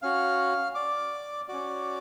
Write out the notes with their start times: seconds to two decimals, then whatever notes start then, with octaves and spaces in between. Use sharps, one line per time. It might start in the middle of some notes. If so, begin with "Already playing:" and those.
0.02 C#4 F#4 F5 F6
0.75 D5 D6
1.48 C#4 F#4 D5 D6